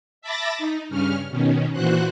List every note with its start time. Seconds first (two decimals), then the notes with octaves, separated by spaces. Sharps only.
0.22 E5 A5 B5 D6 A6 A#6
0.58 D#4
0.89 G2 C#3 C#4 F6
1.30 B2 D#3 C#4
1.73 A#2 E3 F#4 C5 F#6